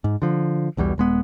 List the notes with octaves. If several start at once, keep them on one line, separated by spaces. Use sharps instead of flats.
G#2
D3 F3
B1 E2 B2 G3
D#1 G#3 B3